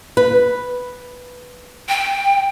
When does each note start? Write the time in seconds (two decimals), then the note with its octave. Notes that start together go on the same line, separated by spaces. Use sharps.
0.17 B4
1.89 G5